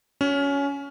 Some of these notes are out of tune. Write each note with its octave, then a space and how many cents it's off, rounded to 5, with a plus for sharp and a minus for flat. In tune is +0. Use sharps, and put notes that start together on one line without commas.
C#4 +20 F#4 +0